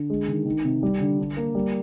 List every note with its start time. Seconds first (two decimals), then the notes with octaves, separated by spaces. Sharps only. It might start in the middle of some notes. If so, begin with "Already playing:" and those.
Already playing: D3
0.10 G#3
0.28 D#3
0.46 D#3
0.64 C3
0.83 G3
1.00 D3
1.19 D4
1.37 A#3
1.55 G3